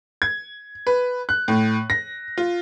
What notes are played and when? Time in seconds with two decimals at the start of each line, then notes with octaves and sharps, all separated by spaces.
0.22 G#6
0.87 B4
1.29 F#6
1.48 A2
1.90 A#6
2.38 F4